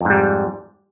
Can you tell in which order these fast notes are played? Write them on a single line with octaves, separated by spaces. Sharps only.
F2 G#2 G3